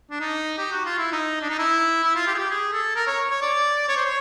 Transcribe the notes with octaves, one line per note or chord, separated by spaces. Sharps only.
D4
D#4
G4
F#4
F4
E4
D#4
D4
D#4
E4
E4
F4
G4
G#4
G4
G#4
A4
A#4
C#5
C#5
D5
C#5
C5
C#5